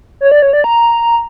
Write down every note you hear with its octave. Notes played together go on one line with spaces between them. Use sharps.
C#5
D5
C#5
D5
A#5